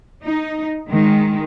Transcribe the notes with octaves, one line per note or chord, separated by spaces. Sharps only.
D#4
D#3 G#3